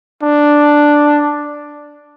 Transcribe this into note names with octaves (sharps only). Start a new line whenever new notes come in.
D4